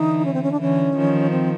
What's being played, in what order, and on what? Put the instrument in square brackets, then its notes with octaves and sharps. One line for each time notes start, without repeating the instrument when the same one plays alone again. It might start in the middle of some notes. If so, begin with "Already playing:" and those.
Already playing: [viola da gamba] D3 E3 [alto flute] D#4
[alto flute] C#4
C4
C#4
D4
[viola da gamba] D3 E3 [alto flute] C#4
[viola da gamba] D#3 F3
[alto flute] C4